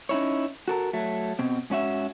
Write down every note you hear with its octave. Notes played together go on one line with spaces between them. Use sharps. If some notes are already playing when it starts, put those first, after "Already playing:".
C#4 D#4 E4 C#5
F#4 A4 A#4
F#3 A3
B2 C4
G#2 C#4 F#4 E5